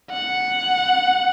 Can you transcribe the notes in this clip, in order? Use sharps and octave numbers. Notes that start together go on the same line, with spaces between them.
F#5